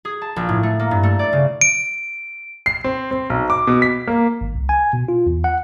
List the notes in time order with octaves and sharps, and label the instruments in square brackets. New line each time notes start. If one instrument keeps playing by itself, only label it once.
[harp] G#4
A5
A#1
A2
A3
A#3
G2
A3
D5
C#3
[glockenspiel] D7
[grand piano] C7
C4
C4
B1
D6
B2
B6
A#3
[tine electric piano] G#1
C2
G#5
B2
F4
E2
F#5